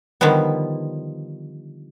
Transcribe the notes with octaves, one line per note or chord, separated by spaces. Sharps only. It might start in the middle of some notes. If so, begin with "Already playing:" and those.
D3 D#3 F3 G3 B3